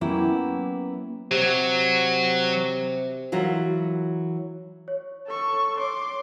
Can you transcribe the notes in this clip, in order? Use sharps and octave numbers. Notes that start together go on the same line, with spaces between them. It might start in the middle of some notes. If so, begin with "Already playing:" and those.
F#3 A#3 B3 C#4 E4 G4
C3 F#3
E3 F#3 F4 F#4 A#4
C#5
A4 C#6
C#5 C6 D6